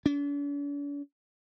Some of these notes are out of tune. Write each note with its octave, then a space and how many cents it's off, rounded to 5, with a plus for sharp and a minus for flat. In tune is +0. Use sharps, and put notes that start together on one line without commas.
D4 -45